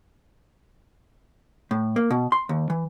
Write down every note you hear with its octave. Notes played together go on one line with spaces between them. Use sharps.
A2
A#3
B2
C6
D#2
E3